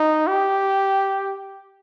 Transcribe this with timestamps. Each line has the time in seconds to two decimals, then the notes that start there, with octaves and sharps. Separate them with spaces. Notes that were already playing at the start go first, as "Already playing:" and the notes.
Already playing: D#4
0.27 G4